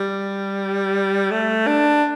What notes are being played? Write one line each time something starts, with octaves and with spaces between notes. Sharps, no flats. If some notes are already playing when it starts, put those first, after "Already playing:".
Already playing: G3
A3
D4